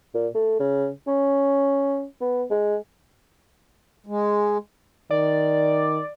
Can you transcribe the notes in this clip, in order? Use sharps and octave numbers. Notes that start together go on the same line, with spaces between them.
A#2
A3
C#3
C#4
B3
G#3
G#3
D#3 D5